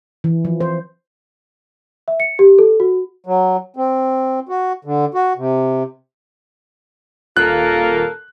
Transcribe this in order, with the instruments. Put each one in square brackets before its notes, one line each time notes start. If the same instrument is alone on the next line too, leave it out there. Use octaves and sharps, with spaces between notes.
[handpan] E3
F3
C5
[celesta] E5
C#7
G4
A4
F#4
[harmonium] F#3
C4
F#4
D3
F#4
C3
[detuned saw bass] D#1 [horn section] A#3 A4 A#4 [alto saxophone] F4 [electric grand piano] F#6